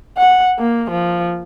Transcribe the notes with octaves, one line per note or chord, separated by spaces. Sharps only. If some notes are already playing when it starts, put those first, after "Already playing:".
F#5
A#3
F3